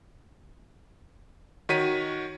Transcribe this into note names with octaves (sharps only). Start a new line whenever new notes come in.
D#3 F#4 C#5 B6 D#7